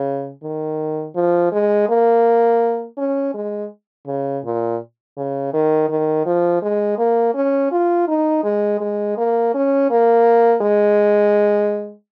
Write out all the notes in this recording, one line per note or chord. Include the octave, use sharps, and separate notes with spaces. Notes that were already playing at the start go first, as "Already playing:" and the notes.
Already playing: C#3
D#3
F3
G#3
A#3
C#4
G#3
C#3
A#2
C#3
D#3
D#3
F3
G#3
A#3
C#4
F4
D#4
G#3
G#3
A#3
C#4
A#3
G#3